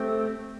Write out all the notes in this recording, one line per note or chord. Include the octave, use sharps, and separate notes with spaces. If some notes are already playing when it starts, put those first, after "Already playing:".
Already playing: A3 C4 G4